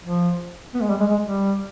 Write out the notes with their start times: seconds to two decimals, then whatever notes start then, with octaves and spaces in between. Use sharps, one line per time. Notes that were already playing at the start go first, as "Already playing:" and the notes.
0.04 F3
0.74 B3
0.82 G#3
0.90 G3
1.00 G#3
1.11 G#3
1.23 G3